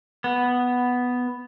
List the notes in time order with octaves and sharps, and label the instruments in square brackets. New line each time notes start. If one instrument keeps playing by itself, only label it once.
[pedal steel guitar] B3